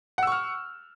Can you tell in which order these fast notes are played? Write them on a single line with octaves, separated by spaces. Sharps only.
F#5 E6 C#6 F6